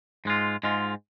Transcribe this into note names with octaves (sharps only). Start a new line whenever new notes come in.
G#2 G#3 F4
G#2 G#3 F4